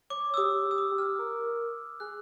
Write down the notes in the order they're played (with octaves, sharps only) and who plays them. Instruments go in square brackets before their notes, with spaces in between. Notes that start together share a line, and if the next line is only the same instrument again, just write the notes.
[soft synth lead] C#5 [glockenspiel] D6
[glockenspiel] E6
[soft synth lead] G4 [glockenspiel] D#6
[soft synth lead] G4
[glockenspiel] E6
D#6
[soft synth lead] G4
[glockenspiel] F6
[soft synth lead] A#4
[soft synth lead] G#4 [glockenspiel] F#6